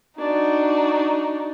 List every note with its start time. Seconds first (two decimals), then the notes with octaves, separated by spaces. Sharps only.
0.19 D4 D#4 F#4